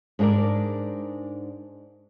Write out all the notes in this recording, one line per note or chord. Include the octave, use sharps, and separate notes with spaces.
G#2 D4 F#4 A#4 D5